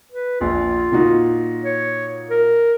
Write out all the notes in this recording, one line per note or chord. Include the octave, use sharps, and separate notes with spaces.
B4
A#1 F4
A#2 D#4 F#4
C#5
A#4